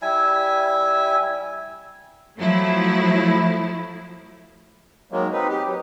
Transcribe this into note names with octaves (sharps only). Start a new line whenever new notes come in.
G3 E4 E5 G#5
F3 F#3 A3 E4
D#3 F#3 G#3 A#3
C4 D#4 B4
G4
F#3